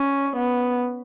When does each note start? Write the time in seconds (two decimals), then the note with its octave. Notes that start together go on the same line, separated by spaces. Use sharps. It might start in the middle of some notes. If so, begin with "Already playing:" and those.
Already playing: C#4
0.36 B3